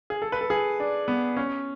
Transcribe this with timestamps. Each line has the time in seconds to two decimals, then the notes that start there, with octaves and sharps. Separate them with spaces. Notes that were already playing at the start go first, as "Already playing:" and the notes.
0.10 G#4
0.22 A4
0.32 B4
0.41 A4
0.50 G#4
0.80 D4
1.08 B3
1.37 C#4